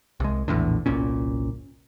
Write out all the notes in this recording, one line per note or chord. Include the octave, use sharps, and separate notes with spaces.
C2 G#3
A#1 E2 A2 D3
G1 C2 A#2 C#4